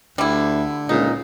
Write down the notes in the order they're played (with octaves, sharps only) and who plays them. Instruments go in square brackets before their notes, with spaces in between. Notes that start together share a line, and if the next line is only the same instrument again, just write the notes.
[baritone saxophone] D2 [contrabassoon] D3 [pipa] G3 E4
[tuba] C#2 [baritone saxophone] A#2 [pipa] D#4